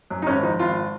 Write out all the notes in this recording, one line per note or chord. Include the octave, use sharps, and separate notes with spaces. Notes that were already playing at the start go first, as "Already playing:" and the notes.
F#2
D#4
G#1 C#4
F3 D#4
G#1 F4